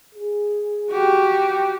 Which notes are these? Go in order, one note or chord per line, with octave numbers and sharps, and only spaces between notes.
G#4
F#4 G4